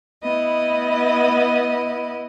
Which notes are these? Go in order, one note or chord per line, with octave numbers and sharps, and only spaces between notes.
B3 E4 D#5